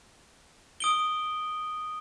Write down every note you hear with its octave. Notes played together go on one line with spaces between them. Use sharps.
D#6 D7 G7